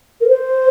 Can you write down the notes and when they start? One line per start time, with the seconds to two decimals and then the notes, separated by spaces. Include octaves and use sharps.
0.21 A#4
0.28 C5